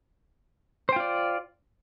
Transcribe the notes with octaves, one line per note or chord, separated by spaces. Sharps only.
F4 C5 D5 G5